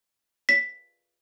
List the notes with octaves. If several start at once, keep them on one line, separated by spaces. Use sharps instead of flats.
B6